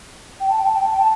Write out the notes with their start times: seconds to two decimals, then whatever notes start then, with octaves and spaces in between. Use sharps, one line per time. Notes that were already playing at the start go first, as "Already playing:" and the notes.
0.40 G5
0.49 A5
0.58 G5
0.66 A5
0.74 G5
0.84 A5
0.92 G5
0.99 A5